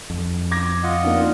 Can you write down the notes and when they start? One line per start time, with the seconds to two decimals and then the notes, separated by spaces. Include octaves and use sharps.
0.10 F2
0.51 D6 G#6 A#6
0.83 F4 D#5 F#5
1.03 A#3 D4 D#4